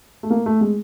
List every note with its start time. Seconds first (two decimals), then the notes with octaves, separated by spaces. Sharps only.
0.23 A3
0.30 A#3
0.46 A3
0.61 G#3